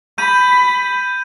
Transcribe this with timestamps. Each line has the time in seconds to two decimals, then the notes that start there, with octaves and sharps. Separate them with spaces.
0.18 B5 G6 D#7